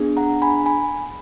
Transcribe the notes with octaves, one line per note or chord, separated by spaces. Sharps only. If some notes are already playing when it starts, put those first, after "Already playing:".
Already playing: B3 D4 G#4
F#5 A#5
G#5 B5
G#5 B5